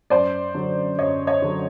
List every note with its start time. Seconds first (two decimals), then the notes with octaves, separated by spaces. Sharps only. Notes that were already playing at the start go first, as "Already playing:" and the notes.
0.10 F#2 C5 D5
0.54 D3 F#3
0.99 F#2 C#5 D#5
1.27 C#5 D#5
1.42 D3 F#3